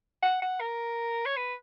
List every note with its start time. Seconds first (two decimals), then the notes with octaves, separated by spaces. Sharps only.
0.23 F#5
0.42 F#5
0.60 A#4
1.26 C#5
1.37 B4